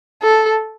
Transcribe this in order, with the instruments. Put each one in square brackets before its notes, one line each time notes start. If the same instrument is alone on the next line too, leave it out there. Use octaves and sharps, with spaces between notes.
[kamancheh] A4